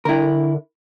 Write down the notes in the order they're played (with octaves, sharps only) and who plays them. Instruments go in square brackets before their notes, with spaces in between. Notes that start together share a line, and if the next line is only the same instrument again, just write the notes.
[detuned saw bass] D3 [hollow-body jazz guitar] E4 A#4